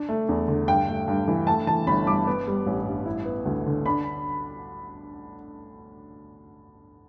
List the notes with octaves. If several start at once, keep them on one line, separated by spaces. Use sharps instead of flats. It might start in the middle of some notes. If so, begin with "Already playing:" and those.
Already playing: D4
A3
E2
D3
G2 G5
A3
G2
E3
A3 A5
E3 A5
G1 B5
G2 D6
B3
G3
A1
G2
E4
B3
D2
D3
D4 B5